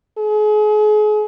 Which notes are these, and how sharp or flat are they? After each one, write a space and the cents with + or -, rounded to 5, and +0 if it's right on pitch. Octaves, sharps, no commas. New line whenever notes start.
G#4 +35